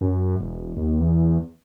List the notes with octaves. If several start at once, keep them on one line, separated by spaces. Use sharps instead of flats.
F#2
E1
D#2
E2